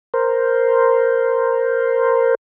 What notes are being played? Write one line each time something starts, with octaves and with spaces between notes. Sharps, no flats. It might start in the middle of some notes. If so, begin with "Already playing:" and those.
A#4 C5